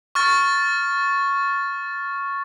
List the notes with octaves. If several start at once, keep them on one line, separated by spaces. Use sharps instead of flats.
C#6 F6 A6